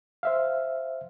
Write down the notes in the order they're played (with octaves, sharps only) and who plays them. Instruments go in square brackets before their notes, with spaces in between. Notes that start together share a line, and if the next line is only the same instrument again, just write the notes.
[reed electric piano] C5 E5 F5